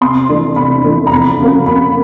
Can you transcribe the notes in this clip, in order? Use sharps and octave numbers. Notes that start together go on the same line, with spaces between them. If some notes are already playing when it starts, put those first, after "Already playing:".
C3 C6
E3 A3 D4
C3 B5
E3 A3 D4
A#5
F2 B5
C#3 F#3 A#3
F2 B5